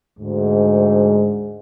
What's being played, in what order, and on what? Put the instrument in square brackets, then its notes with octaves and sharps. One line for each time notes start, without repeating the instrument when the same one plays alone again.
[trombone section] D2 G#2